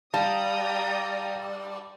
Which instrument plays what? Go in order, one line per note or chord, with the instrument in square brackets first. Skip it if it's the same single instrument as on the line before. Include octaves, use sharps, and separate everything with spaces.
[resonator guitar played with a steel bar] G3 [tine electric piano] F5 [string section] G5 A#5 D#6 [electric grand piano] A5